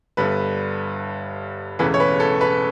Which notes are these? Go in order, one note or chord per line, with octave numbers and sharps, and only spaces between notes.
G1 G2 D3 B4
E1 E2 C#3 E3 A3 B4
C#5
B4
A4
B4